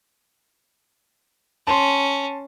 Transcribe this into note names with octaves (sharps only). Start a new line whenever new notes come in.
C#4 A5 C6